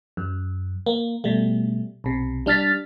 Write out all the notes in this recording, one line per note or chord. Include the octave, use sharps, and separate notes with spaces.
F#2
A#3
B2 G3 A3
B1 C3
G3 D4 F6 A6 B6